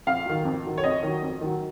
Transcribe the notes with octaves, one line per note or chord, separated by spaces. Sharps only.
F2 F5
D#3 F#3
F2
D#3 F#3
C#5
F2 D#5
D#3 F#3
F2
D#3 F#3